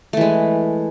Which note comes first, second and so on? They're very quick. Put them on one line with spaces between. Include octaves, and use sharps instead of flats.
A3 E3 G#3